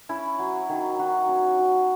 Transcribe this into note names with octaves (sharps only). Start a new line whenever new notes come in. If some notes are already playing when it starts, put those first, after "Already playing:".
C#4 E4
F#3
D#3
D#3 F#4
C#4
F#3